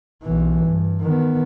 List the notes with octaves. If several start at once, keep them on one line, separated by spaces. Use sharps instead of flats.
B1 E3
G2
D#3 B3